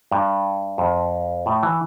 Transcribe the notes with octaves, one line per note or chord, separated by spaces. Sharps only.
G2
F2
A2
E3